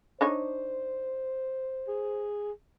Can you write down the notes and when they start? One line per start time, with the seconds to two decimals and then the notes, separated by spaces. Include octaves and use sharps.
0.21 D4 D#4 C5 C#5
1.88 G#4